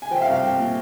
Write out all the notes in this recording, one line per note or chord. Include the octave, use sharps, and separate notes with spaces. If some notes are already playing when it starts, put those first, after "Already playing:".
G#5
F3 G5
E5
F5
C2
F5
C2 G5
A#2